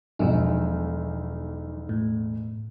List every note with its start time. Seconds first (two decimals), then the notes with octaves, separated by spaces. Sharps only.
0.19 E1 B1 F3 F#3 D#4
1.89 A2